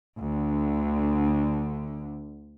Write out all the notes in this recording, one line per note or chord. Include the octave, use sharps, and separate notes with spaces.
D2 D3